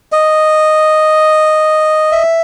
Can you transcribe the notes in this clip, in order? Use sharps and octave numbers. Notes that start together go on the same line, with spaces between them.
D#5
E5